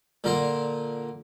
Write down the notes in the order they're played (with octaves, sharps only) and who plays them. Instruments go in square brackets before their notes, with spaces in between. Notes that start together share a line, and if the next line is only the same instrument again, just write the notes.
[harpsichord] A#2 D3 A#4 C5